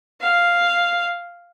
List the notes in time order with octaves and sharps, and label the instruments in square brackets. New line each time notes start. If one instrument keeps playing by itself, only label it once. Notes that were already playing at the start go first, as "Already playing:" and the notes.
[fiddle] F5